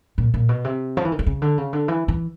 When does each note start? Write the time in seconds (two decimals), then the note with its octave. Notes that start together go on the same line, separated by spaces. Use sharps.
0.18 A#2
0.34 A#2
0.49 B2
0.64 C3
0.97 F3
1.05 E3
1.12 D#3
1.19 D3
1.27 C#3
1.42 D3
1.58 C#3
1.73 D3
1.88 E3
2.08 E3